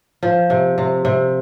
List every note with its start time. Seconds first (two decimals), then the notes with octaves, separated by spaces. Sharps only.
0.23 F3
0.50 C3
0.78 C3
1.05 C3